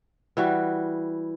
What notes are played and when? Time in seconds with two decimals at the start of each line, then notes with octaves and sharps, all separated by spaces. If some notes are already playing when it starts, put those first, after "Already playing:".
0.37 E3 G3 F#4